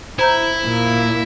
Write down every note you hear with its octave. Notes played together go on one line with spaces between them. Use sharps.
E4 C5 A#5 G6
A#2 A#3